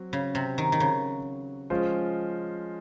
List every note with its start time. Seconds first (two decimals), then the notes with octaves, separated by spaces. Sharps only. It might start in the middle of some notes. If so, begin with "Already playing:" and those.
Already playing: F#3 C4 F#4
0.13 C#3
0.35 C3
0.58 D#3
0.72 D#3
0.80 C#3
1.70 F3 G#3 C#4 F4 C5